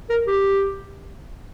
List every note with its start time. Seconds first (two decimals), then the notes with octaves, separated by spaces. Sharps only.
0.10 A#4
0.27 G4